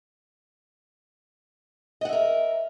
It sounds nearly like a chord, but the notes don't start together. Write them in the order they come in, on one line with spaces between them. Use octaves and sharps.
D#5 F#5 E5 A#4